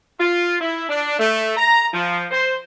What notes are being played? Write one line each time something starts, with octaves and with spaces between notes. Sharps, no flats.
F4
E4
D4
A3
A#5
F3
C5